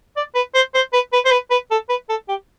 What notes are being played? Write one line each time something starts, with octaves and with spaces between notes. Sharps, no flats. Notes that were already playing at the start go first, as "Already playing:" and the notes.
D5
B4
C5
C5
B4
B4
C5
B4
B4
A4
B4
A4
G4